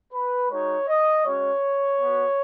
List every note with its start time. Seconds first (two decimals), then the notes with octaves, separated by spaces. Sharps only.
0.13 B4
0.51 G#3 D#4 F#4 C#5
0.88 D#5
1.25 G#3 C#4 F#4 C#5
2.00 B3 F#4